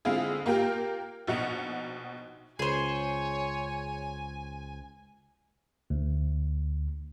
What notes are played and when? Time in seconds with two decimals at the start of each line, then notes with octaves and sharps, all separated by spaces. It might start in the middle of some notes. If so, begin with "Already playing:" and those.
0.05 D3 G#3 C4 E4 F4 G#4
0.46 A#3 F4 G4 A#4 G5
1.27 A#1 B2 D#4 F#5 C#7 F7
2.59 C#2 G#4 C5 C#5 G#5
5.90 D2